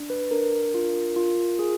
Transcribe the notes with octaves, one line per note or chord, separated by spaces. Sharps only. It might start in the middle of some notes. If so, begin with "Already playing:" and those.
Already playing: D4
B4
D4 A#4
F4
F4
G#4